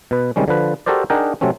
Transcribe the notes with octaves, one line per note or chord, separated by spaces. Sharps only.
B2 B4
C3 D#3 G3 G#3 C#4
D3 F3 B4
F#4 G4 A4 A#4 C5 D5
D4 D#4 G#4 A#4 F#5 G5
C3 F#3 A3 C4 C#4